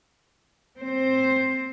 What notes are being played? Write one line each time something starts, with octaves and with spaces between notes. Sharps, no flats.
C4 C5